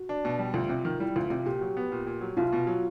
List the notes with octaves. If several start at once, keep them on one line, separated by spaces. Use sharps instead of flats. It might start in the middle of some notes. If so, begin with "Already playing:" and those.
Already playing: F#4
D4
B2
G3
D2 F4
C3
D#3
G3 E4
D2 F4
C3 F4
A#2 G4
F#3
B3
A#2
A#2
F#3
C2 F4
B2
F#3